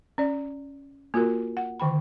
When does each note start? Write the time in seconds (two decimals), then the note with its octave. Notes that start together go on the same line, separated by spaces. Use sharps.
0.18 C#4 D5
1.14 A#3 F4 F#4 A#4
1.57 F#5
1.80 D3 D#3 G5 B5